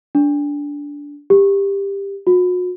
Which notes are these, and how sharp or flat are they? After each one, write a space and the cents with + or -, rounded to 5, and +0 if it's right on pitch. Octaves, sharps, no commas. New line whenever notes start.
D4 -20
G4 +15
F#4 -40